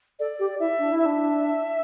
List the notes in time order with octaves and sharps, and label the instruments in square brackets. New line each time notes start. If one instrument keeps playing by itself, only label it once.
[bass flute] A4 [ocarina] D5
[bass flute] G4
[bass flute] E4 [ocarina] E5
[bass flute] D4
E4
[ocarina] E5
[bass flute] D4